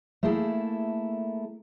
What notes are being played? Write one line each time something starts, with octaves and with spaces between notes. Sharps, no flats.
A3 A#3 E4 G#4 A4